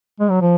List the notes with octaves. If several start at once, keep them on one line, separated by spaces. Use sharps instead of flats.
G#3
F#3
F3